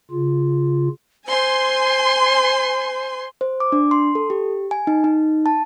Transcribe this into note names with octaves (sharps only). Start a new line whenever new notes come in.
C#3 F4
C5 G#5 C6
C5
D6
D4
C6
A4
G4
G#5
D#4
D#4
A5